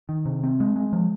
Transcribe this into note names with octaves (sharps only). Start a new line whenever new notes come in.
D#3
C3
C4
G#3
G#3
F3